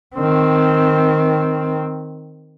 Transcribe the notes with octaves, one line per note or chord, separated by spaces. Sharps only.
D#3 C4